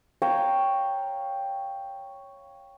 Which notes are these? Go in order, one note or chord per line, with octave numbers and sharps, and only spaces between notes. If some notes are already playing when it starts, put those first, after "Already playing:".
C#5 F5 G5 A#5